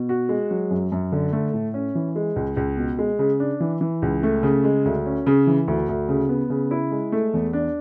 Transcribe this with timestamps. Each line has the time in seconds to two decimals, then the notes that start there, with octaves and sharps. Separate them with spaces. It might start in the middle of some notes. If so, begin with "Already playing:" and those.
Already playing: B2
0.09 F#4
0.29 G#3
0.51 F#3
0.70 F#2
0.92 F#2
1.12 D3
1.33 A3
1.54 A2
1.74 C#4
1.95 E3
2.16 G#3
2.36 C#2
2.57 C#2
2.78 B2
2.99 G#3
3.19 C#3
3.40 D4
3.60 E3
3.81 E3
4.02 C#2
4.23 A3
4.43 C#3
4.64 G#3
4.85 D2
5.06 C#4
5.26 C#3
5.47 E3
5.68 D2
5.89 D2
6.09 C#3
6.29 B3
6.50 C#3
6.71 E4
6.91 G#3
7.12 A3
7.34 E2
7.53 D4